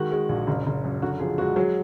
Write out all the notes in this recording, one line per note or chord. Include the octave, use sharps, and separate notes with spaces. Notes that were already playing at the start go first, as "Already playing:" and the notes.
Already playing: D#3 G#3 F#4
G#3
A#1
F#1
F#1
F#2
D3 F#4
F3 G#4
G#3 F#4
F#3 G#4